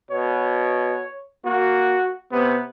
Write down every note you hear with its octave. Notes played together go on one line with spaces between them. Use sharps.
B2 C#5
A#3 F#4
C3 B3